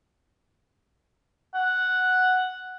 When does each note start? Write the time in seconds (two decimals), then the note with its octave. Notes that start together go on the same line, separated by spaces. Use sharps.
1.55 F#5